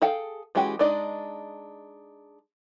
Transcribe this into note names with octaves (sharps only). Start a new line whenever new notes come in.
G#4 A4 F5 G5
E3 G#3 C#4 F#4 G4
G#3 D4 D#4 D5 D#5